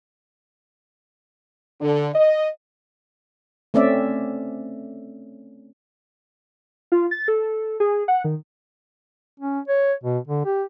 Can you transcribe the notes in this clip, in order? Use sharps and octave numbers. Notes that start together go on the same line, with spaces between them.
D3
D#5
A3 C4 C#4 D5 E5
F4
A6
A4
G#4
F#5
D#3
C#4
C#5
B2
D3
G4